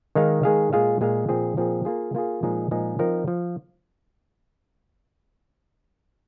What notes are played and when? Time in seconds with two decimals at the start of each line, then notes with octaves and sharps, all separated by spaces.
0.15 D#3 G#3 D#4 G#4 F5
0.43 D#3 G#3 D#4 G#4 F5
0.73 A#2 G#3 F4 G#4 F5
1.01 A#2 G#3 F4 G#4 F5
1.29 A#2 F3 C4 G#4
1.57 A#2 F3 C4 G#4
1.85 A#3 F4 G#4
2.15 A#3 F4 G#4
2.43 A#2 F3 G#3 D#4 G#4
2.71 A#2 F3 G#3 D#4 G#4
2.99 F3 C4 D#4 A#4 F5
3.28 F3